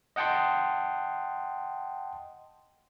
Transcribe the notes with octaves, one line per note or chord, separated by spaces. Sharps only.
D#5 F#5 G5 A5 C6